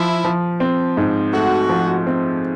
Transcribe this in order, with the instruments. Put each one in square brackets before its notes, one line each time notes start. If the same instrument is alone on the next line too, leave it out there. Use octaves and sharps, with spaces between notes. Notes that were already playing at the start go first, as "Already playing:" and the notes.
Already playing: [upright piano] F3 [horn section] E4
[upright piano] F3
C4
G#2
[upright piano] A3 [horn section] F#4
[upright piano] F3
C4